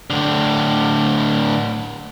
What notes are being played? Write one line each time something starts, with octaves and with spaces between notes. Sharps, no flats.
A2 D3